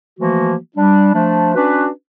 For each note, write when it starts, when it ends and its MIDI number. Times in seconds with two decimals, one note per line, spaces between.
0.19 0.55 52
0.19 0.55 53
0.19 0.55 57
0.19 0.55 58
0.19 0.55 66
0.76 1.14 55
0.76 1.14 62
1.14 1.52 53
1.14 1.52 57
1.14 1.52 62
1.55 1.89 61
1.55 1.89 62
1.55 1.89 66
1.55 1.89 71